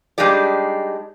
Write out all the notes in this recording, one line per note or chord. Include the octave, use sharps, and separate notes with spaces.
G3 G#3 D4 D#4 G4 D5